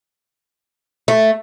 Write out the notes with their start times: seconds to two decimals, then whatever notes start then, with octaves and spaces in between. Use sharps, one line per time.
1.08 A3